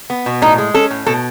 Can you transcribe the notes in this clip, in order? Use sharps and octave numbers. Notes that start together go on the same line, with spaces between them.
B3
B2
A2 D#4
G#3
C#4 A4
A2
B2 A4